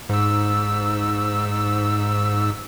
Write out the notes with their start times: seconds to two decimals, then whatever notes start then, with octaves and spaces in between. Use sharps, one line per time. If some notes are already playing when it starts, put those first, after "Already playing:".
0.09 G#2 E6